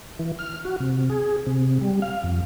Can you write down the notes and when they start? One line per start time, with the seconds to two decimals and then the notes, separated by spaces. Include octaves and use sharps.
0.19 E3
0.39 F6
0.65 F#4
0.80 C3
1.10 G#4
1.46 C3
1.81 G3
2.02 F5
2.24 F2